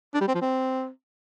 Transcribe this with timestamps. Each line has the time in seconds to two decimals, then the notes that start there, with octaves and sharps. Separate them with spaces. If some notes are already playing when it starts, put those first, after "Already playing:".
0.14 D4
0.21 G3
0.28 C4
0.35 F3
0.42 C4